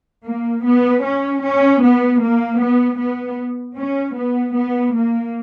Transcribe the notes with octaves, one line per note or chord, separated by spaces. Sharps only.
A#3
B3
C#4
C#4
B3
A#3
B3
B3
C#4
B3
B3
A#3